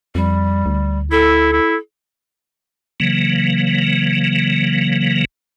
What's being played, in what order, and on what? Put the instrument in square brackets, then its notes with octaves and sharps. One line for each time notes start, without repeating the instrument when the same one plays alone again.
[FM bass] F2 [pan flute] G3
[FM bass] D2
[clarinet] E4 [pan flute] A4
[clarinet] E4
[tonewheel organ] C#3 E3 F#3 A#3